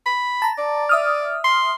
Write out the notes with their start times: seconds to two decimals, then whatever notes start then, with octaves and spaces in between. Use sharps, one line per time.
0.06 B5
0.42 A5 A#5
0.58 D5
0.89 E5 D#6 F6
1.44 C6